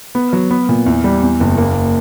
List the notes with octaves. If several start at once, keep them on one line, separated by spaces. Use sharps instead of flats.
B3
F#3
B3
A#2
E2
G3
E2
F#1
A#3